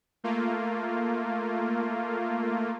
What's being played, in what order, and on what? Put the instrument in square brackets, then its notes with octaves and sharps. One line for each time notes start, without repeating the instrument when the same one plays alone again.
[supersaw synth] A3 A#3 F4